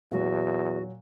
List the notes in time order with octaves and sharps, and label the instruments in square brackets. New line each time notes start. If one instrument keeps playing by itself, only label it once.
[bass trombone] E2 [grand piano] A#2 F#3 [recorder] F#4